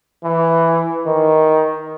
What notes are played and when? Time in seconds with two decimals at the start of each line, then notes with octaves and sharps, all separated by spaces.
0.24 E3
1.06 D#3